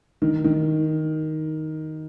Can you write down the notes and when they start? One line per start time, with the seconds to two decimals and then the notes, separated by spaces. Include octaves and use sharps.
0.22 D#3
0.44 D#3